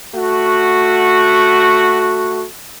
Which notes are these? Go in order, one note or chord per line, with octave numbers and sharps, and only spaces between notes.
A3 F#4